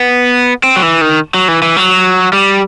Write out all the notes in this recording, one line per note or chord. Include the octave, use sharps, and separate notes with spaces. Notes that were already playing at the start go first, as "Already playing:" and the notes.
Already playing: B3
C4
F#3
E3
D#3
F#3
E3
E3
F#3
G3